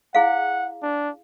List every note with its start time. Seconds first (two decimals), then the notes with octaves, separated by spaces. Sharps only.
0.15 E4 G#4 F5 F#5
0.82 D4